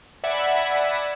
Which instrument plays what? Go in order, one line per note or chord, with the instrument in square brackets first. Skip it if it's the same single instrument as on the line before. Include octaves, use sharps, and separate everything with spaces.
[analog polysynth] D5 E5 F#5 G#5 B5 E6